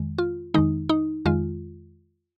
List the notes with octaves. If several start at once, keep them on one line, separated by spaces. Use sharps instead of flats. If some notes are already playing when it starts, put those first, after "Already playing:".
Already playing: F2 D#3 G#3
F4
F2 D#3 G#3 D#4
D#4
F2 D#3 G#3 F4